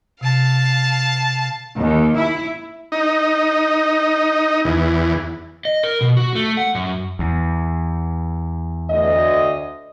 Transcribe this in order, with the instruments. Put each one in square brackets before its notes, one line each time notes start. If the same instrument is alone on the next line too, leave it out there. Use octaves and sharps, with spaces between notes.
[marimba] C3 [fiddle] F5 A5
[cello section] D#2
E4
[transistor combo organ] D#4
E2
[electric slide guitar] D#5
A#4
B2
F#4
A3
F#5
F#2
[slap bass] E2
[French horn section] D2 D#5